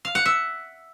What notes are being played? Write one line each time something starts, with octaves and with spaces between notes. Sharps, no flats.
F5
F#5
E5